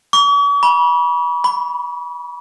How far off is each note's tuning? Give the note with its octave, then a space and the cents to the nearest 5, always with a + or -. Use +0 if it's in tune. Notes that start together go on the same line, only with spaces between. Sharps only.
C#6 +45
B5 -35
B5 +10